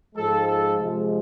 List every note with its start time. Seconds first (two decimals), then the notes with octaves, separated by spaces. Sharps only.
0.15 G#2 F3 G#3 A4
0.47 A4
0.79 C3 F3 G#3